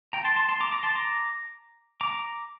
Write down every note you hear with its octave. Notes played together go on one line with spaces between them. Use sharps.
G5 A#5
A5 C6
A5 C6
A5 C6
A#5 D6
A#5 D6
A5 C6
A#5 D6
A#5 D6